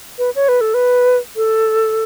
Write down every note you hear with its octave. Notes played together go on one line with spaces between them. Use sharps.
B4
C#5
B4
A4
B4
A4